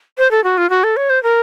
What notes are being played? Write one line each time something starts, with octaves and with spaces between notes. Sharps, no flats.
C5
A4
F#4
F4
F#4
A4
C#5
C5
A#4